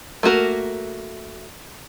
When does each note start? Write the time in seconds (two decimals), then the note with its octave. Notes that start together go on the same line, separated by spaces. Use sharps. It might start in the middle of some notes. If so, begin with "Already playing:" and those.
0.23 A3 A#3 F#4 A#4